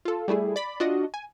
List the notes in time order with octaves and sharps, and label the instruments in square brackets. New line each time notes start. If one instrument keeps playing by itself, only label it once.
[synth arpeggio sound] F4 A4
G3 A3 E4 G#4
D5 B5
D4 F4 F#4 D#5
G#5